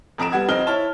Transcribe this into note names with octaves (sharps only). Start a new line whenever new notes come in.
F1 F2 A#5 D7 E7
G3 B3 F#5 G#6
F2 C4 D#4 D#5 F6 G7
E4 C#5 A5